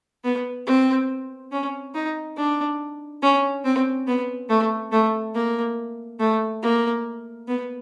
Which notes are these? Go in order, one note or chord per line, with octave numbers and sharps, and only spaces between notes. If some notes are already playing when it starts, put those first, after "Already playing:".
B3
C4
C#4
D#4
D4
C#4
C4
B3
A3
A3
A#3
A3
A#3
B3